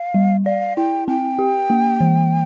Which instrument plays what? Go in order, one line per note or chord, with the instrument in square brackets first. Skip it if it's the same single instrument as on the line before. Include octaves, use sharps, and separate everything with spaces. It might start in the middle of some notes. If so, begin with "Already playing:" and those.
Already playing: [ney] F5
[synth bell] G3
[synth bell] D5 [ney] F5
[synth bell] E4 [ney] G5
[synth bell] C4 [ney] G5
[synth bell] G4
A#3
E3